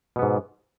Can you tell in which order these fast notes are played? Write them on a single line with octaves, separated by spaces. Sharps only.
B2 B3 G#2